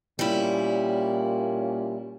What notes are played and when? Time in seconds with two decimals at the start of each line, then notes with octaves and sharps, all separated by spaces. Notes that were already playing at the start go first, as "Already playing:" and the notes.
0.19 A#2 G3 C#4 E4